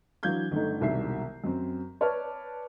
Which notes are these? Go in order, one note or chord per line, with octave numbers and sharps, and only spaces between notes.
E3 F#3 D4 F5 G6 G#6
G1 A3 D#4
E1 C2 D#3 E5 C7
F#2 C4
B4 C#5 D5 A5 C#6 F6